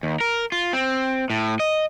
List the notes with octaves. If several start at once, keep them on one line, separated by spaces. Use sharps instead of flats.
D#2
A#4
F4
C4
A2
D#5